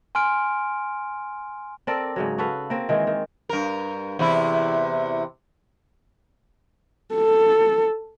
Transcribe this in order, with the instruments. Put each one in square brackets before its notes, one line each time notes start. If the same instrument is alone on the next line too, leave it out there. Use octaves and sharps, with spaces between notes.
[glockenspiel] G#5 C6 F6 D7
[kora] C4 A4 A#4 D5
G#2 C#3 F#3
F#4 A4 B4 F5
A#3 C4
D#3 E3 G#3
D#3
[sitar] G2 A#4
E2 C3 E4
[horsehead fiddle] A4